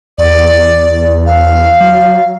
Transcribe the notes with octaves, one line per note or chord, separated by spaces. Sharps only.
E2 D5
F5
F#3